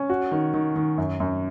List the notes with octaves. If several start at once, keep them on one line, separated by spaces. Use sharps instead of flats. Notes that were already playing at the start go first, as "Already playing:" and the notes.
Already playing: C#4
F#4
D#3
D#3
D#3
F#2
F#2